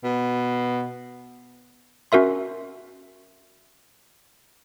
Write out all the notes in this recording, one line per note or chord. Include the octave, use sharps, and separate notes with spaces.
B2
C#4 F#4 A#4 E5 C6